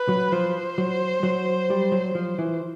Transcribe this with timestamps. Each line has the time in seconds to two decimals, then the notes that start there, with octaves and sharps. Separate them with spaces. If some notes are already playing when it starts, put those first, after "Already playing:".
Already playing: B4
0.09 F#3
0.32 F3 C5
0.78 F#3
1.23 F#3
1.70 G3
1.92 F#3
2.15 F3
2.38 E3